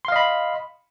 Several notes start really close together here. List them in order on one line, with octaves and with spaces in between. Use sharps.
C6 F5 D#5 B5